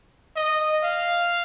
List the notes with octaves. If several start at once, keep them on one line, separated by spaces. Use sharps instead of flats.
D#5
F5